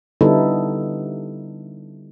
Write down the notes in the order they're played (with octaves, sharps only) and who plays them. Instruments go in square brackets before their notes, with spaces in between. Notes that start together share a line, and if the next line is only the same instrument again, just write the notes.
[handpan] D3 G3 B3 D#4 E4 A4